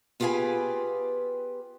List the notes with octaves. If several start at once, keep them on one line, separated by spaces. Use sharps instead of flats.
B3 F4 G4 G#4 B4 G#5